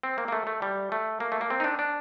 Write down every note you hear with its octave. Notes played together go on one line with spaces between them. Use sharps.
C4
A#3
A#3
A3
A3
G3
A3
A#3
A3
A#3
C4
D#4
D4
D4